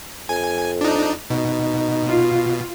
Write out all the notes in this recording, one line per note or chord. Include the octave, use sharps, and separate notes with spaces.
F2 G#5
D4 D#4
B2 D#4
F4